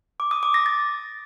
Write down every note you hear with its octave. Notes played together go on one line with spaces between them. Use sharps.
D6
D#6
D6
A#6
A6